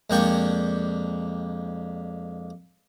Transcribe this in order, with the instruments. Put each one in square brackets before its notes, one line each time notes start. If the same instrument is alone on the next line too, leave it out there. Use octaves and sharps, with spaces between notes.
[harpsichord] F2 G#3 A#3 D4 G5 C#6